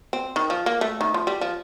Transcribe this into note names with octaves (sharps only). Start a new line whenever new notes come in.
C4
D#3
F3
A#3
A3
D#3
F3
G3
F3